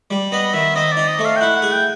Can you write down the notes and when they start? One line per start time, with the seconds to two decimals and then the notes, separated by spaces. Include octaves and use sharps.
0.11 G3
0.32 B3 D#5
0.54 D#3 E5
0.76 C4 D#5
0.92 D#4 D5
1.08 D#5
1.19 A3
1.25 F5
1.36 G5
1.41 E4 F#5
1.56 F#5
1.62 G#4
1.72 G5